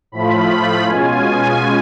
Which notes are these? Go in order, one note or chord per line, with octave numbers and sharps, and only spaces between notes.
A2 F3 A3 F4 B5
B2 G#3 C#4 F4 G#5